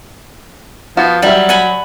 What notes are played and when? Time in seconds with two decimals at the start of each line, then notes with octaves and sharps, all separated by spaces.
0.97 F3 B3 F#4
1.22 F#3 G3 E5 G5
1.49 F#5 G#5 B5